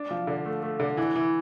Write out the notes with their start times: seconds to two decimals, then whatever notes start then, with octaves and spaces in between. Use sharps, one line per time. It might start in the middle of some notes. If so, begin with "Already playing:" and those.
Already playing: D4
0.11 F3
0.27 D3
0.45 A3
0.63 A3
0.80 D3
0.97 E3
1.16 E3